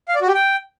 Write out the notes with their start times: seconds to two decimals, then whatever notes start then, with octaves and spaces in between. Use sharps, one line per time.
0.08 F5
0.15 D5
0.21 F#4
0.28 G4
0.34 G5